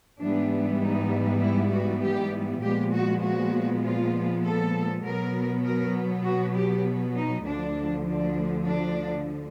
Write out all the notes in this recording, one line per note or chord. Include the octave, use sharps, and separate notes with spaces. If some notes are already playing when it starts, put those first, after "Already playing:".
G#2 E3 G3 B3 D4
D#4
E4
F#4
G4
A#2 F3 G#3 B3 G4
F#4
F#4
F4
A4
B2 F#3 B3 A#4
A#4
F#4
G4
D#4
D2 D3 F3 D4
D4
D4